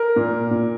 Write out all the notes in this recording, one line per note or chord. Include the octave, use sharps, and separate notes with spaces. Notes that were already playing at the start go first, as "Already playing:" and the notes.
Already playing: A#4
A#2
A#2